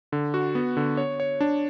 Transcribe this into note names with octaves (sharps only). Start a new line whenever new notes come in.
D3
F#4
B3
D3
C#5
C#5
D4